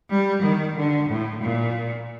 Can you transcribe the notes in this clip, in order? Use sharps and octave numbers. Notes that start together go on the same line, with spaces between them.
G3
D#3
D3
A2
A#2